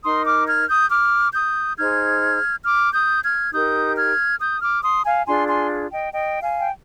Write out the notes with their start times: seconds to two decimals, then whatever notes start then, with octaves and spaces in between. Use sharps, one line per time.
0.04 D#4 A#4 C6 D#6
0.26 D6 F6
0.48 F6 G#6
0.70 D#6 G6
0.91 D6 F6
1.34 D#6 G6
1.78 D#4 G#4 C5 F6 G#6
2.66 D6 F6
2.94 D#6 G6
3.23 F6 G#6
3.53 D#4 G4 A#4 D#6 G6
3.96 F6 G#6
4.40 D#6 G6
4.62 D6 F6
4.83 C6 D#6
5.05 F5 G#5
5.26 D4 F4 G#4 G#5 C6
5.48 G#5 C6
5.92 D#5 G5
6.13 D#5 G5
6.43 F5 G#5
6.60 G5